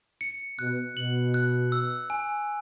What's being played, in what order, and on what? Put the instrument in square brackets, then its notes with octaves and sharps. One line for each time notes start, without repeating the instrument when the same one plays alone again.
[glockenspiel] C#7
[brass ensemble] B2 [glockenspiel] F#6
[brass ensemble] B2 [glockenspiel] F#7
[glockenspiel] F#6
E6
G#5